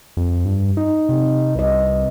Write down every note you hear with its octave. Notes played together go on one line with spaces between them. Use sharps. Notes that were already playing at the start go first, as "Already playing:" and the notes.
F2
G2
D#4
C3
C2 B4 D#5